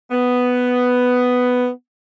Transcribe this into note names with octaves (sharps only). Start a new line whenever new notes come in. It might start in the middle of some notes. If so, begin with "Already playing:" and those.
B3